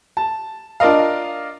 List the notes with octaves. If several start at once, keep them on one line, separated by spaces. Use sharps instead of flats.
A5
D4 F4 A#4 D#5 F5